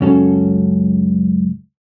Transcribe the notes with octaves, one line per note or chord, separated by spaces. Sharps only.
C#2 F#2 C#4 F#4 A4